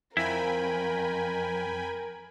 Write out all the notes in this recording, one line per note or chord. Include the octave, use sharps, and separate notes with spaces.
F2 E4 A#4 G5 G#5 B5